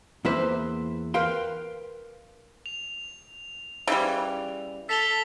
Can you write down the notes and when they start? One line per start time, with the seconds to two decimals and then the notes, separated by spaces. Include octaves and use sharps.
0.25 E2 A#3 E4 B4 C5 E5
1.14 A#4 B4 F5 G5 C6
2.66 F7
3.87 C#3 E3 G3
4.89 A4 B6 F7 G7